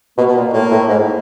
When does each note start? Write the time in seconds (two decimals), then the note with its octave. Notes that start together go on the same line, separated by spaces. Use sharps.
0.18 B2 A#3
0.27 B3
0.36 A#2 A#3
0.53 A2 A#3
0.71 A2
0.88 G#2 A3
1.00 A#3